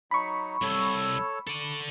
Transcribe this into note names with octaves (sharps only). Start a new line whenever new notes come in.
F#3 D#4 B5 C#6
C2 A4 C#5 E6
A4 D5